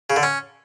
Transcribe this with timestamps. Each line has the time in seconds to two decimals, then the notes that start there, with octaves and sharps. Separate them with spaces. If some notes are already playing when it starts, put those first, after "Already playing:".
0.10 C#3
0.16 D3
0.23 C#4